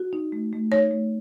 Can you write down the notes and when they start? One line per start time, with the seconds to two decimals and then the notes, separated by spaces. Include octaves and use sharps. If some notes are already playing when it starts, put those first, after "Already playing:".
Already playing: F#4
0.13 D#4
0.32 A3
0.53 A3
0.72 D#4 C#5
0.91 A3